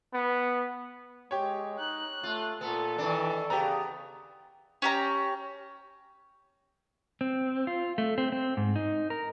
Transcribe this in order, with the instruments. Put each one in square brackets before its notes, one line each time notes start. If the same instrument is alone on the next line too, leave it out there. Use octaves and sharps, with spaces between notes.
[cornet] B3
[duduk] G#3 [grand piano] G4 C#5
[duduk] D#4 [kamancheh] F#6
[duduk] A3 [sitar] F4
[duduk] A#2 [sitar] B3 [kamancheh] A4
[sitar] D#3 D4 [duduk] E3
[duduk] C#3 [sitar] B3 [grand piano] G4 A#5
[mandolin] C#4 G4 A#5
[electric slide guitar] C4
F4
A3
C4
C4
G#2
D#4
A#4